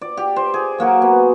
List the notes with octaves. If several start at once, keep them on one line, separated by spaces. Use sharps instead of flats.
D5
G4
C5
G#4
F#3 A#3 F#4 A#4
B3